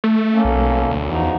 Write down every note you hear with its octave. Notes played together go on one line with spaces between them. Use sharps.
A3
A#3 C#4 A4
B1
D2
E2 F3 D#4 F#4